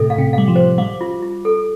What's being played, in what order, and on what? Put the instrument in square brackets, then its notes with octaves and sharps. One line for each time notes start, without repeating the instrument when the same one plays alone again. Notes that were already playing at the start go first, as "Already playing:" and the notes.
Already playing: [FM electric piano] A2 C3 [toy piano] A4
[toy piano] F5
[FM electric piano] C3
[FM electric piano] G3 [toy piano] F5
[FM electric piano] F3
[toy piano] C5
[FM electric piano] G3 [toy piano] F5
[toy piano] F4
F4
A4